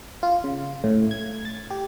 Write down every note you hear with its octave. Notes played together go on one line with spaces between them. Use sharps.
F4
C#3
A2
G#6
A6
G4